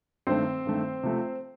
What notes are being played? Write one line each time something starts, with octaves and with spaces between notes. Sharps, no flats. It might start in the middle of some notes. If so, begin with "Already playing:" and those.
G2 D#3 A3 C4 C5
G2 D#3 A3
C3 F3 A3